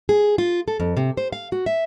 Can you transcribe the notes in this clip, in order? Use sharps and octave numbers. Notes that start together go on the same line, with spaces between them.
G#4
F4
A4
F2
C3
C5
F5
F#4
E5